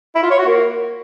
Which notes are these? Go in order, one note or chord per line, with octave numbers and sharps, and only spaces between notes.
E4
F4
C#5
F#4
A#3